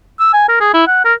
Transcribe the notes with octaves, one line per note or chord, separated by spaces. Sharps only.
E6
G#5
A#4
G#4
E4
F#5
A#4